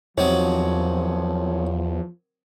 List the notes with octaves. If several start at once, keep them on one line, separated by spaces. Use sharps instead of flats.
E2 C3 D#3 F3 F#3 C#5